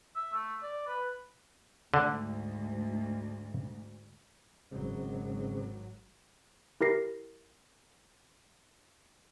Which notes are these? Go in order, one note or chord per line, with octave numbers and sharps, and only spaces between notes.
E5
A3
D5
B4
D2 G#2 D3
G#1 C#3 F#3 G#3 C4
E4 G4 A#4 A#6 C7